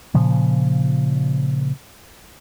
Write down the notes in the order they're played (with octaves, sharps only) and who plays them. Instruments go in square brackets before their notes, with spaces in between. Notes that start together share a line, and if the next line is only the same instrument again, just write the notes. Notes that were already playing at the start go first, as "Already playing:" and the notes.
[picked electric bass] A#2 C#3 F3